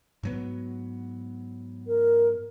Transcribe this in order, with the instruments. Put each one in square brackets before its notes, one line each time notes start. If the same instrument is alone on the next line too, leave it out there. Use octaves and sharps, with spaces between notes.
[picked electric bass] G#2 F#3 B3
[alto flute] A#4